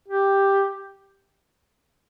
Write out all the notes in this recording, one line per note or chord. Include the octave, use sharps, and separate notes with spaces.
G4